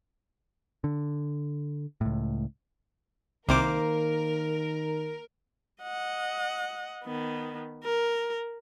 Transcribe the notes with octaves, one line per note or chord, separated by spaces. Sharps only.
D3
C#2 A2
C2 C3 D#3 A#3 A#4 C5 D6
D#5 F#5
D#3 B3
A#4